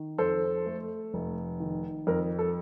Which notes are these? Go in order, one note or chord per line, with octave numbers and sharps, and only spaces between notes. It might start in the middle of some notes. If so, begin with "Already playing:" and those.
Already playing: D#3
F2 A4 C5
A3
F1
D#3
F2 A#4
A4